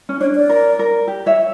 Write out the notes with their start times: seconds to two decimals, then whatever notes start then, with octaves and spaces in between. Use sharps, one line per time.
0.09 C#4
0.20 D4 C#5
0.35 D5
0.50 A#4
0.79 A#4
1.07 G4
1.26 C#5 E5